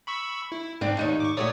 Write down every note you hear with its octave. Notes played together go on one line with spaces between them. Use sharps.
B5 C#6 E6
E4
G#2 C4 D4
D#2 D#4 C#5
C#6 D6
A#2 A3 F#4 C#5 D5 D#6